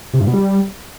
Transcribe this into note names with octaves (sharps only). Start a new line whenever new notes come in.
C3
G2
B2
G3